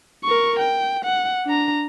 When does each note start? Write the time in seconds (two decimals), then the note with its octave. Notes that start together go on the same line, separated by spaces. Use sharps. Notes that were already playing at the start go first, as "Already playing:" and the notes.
0.25 A#4 C#6
0.59 G5
1.04 F#5
1.46 D4 A#5